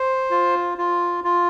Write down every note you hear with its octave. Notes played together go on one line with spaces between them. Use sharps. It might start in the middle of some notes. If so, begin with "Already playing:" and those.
Already playing: C5
F4
F4
F4